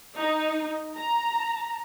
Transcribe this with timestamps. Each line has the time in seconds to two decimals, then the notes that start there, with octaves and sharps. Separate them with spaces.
0.18 D#4
0.96 A#5